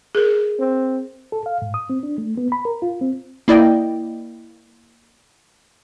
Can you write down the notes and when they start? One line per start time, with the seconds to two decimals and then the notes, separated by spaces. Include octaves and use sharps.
0.15 G#4 A#4
0.59 C4
1.32 A4
1.46 F5
1.62 G#2
1.74 D#6
1.90 C4
2.03 D4
2.18 A3
2.37 B3
2.52 B5
2.65 A#4
2.82 F4
3.01 C4
3.48 A#3 E4 D5 D#5 G5